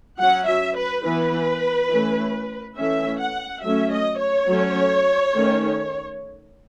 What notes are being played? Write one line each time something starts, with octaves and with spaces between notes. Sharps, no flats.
F#3 C#4 F#5
E5
B4
E3 B3 B4
E3 A3 C#4
E3 A3 C#4 E5
F#5
F#3 A3 C#4 E5
D#5
C#5
F#3 A3 C#4
D#3 A3 C#4